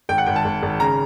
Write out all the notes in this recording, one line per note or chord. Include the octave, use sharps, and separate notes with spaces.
G#1 G5
F#5
G#1 G5
A5
G#1
G#1
C#3 A#5